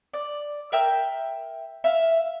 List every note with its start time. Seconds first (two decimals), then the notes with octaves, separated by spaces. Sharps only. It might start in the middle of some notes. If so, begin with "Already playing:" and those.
0.14 D5
0.72 A#4 E5 G5 E6
1.84 E5 F5